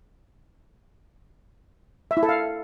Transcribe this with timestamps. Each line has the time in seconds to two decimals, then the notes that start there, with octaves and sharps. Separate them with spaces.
2.11 E5
2.17 E4
2.23 A4
2.29 F5